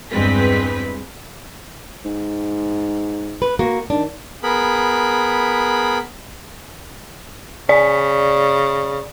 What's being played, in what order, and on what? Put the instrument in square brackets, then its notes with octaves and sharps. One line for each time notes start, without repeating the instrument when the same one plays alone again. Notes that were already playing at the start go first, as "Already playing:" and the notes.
[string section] E2 G2 G#3 C4 B4 B6
[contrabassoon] G#2
[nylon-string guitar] B4
A#3 F#4
[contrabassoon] D#3 [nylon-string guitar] D4
[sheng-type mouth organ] B3 G#4 A#4 B5
[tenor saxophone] C#3 [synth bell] D5